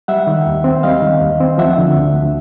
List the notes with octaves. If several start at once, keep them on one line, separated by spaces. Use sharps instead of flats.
G3 E5 F#5
D#3
D#2
C4
G3 D#5 F5
D#3
D#2
C4
F3 E5 F#5
D3
D2
D2